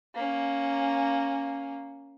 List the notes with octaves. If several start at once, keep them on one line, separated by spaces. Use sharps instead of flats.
A#3 C#4